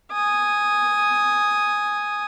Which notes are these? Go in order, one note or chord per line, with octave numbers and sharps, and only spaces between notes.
G#5 D#6